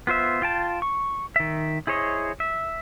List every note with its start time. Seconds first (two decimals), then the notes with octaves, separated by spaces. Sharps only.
0.07 B3 F4 C5 E5
0.42 F4 G5 A5
0.82 C#6
1.36 D#3 E5
1.87 E4 G#4 C5 C#5 D#5
2.40 E5